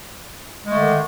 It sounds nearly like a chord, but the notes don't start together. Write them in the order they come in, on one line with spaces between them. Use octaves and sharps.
G#3 A3 D3 D#3